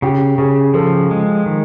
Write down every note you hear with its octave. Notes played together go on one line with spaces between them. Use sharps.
C#3 G4
C#3 G#4
F3 A4
G#3
D#3